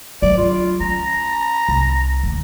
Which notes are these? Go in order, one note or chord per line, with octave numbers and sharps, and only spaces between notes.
F#3 D5
F4
C#4 A#5
C2
D#2 D3